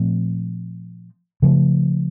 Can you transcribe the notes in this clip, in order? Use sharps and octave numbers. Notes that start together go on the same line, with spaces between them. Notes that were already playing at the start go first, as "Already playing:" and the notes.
Already playing: A#2 F3 A3 C4
C#3 F3 A3